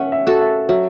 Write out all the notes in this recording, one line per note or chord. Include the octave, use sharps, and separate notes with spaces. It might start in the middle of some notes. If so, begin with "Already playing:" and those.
Already playing: C#4 E5 F#5
E5
F#4 A4
E5
F#3 E5